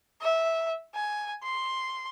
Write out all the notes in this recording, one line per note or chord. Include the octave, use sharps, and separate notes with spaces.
E5
G#5
C6